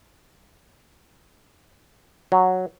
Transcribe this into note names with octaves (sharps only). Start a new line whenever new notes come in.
F#3